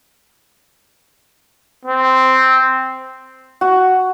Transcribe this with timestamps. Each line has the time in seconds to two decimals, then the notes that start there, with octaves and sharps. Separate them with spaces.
1.86 C4
3.61 F#4